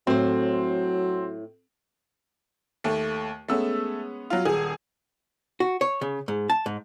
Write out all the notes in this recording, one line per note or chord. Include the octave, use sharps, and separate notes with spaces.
A2 F#3 C4 C5
D#2 A3
G#3 A3 B3 C#4 E6
F#3 F4
D#1 G#4
F#4
C#5
C#3
G#2
A5
G#2